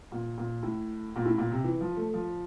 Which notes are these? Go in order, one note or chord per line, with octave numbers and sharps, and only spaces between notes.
A#2
A#2
A2
A#2
A2
A#2
C3
E3
F3
A3
F3